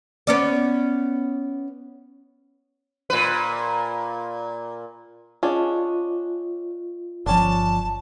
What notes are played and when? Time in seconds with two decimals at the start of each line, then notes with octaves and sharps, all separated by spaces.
0.27 B3 C#4 D5
3.10 A#2 B4
5.43 C#4 D4 F4 G#4 D#5
7.26 G1 F3 C#4 D4 A5